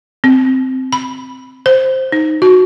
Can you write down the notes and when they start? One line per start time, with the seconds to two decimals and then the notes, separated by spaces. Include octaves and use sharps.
0.24 C4
0.93 B5
1.66 C5
2.12 D#4
2.42 F#4